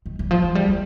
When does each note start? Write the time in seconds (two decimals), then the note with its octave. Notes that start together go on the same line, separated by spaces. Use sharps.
0.06 D#3
0.19 E3
0.31 F3
0.44 F#3
0.55 G3
0.69 A3